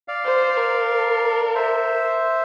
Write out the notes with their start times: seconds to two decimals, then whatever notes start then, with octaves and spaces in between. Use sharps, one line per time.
0.08 D5 F5
0.25 C5
0.57 A#4
1.55 C5 E5